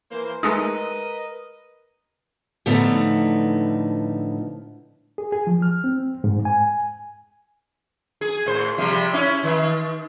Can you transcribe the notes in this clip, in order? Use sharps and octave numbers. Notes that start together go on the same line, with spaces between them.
E3 A#3 C5
G#3 A3 D#4 A#4 B4 D#5
A2 D3 F3 A3 B3 D#4
G#4
G#4
F3
F6
C4
G#2
G#5
G#4
A2 C5
C3 F3 G3
C#4 E4
D#3